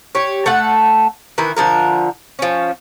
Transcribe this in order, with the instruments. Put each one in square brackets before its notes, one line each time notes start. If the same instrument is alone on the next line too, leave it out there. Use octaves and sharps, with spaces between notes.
[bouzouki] G4 C#5
A3 A4 F#5
D#3 E3 E4
D3 F3 G#3 A#4
F3 C#4